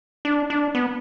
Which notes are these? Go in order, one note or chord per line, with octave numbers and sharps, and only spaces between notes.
D4
D4
B3